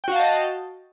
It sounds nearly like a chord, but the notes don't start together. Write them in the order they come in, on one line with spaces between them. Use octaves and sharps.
G5 F#4 F5 A5 D#5